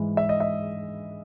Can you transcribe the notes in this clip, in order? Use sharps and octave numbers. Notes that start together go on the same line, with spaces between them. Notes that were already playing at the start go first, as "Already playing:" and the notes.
Already playing: G#2 E3 G#3
E5
D#5
E5